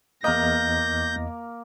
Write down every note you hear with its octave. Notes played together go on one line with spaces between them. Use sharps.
E2 A#3 A#4 D#5 G6 A#6